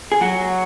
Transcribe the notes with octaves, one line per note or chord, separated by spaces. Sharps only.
G#4
F#3 F#4